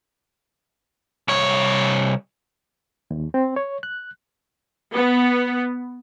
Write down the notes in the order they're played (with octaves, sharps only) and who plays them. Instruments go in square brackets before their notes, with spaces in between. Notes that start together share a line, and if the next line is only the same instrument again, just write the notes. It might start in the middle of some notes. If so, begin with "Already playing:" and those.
[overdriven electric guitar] C2 C#5
[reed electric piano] D#2
C4
C#5
F#6
[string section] B3